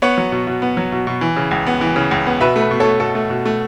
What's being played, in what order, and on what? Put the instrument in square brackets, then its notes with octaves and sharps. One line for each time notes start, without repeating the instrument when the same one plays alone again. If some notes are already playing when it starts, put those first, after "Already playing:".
[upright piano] B3 C#5 F#5
F#3
B2
B2
B3
F#3
B2
B2
E3
C#3
C#2
B3
E3
C#3
C#2
B3
B2 B4 E5
A3
B4
B2
A4 C#5
A3
B2 A4
A3
B2
A3